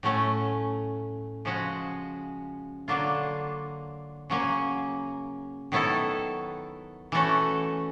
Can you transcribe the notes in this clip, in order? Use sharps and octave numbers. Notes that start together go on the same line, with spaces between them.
A2 F#3 A3 C#4
C#3 F3 G#3 C#4 F#4
D3 F#3 A#3 D4 F4
C#3 F#3 A#3 C#4
D#3 F#3 B3 E4 A4
E3 A3 C#4 F#4 A4